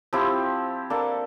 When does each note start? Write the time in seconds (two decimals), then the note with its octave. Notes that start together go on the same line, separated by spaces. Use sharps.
0.13 F3 C4 E4 G4
0.90 A#3 D4 A4